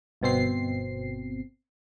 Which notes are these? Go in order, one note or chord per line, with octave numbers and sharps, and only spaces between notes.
G1 B2 C4 C7